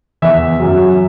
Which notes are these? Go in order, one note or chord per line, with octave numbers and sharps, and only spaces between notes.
E2 E3 E5
F#2 F#3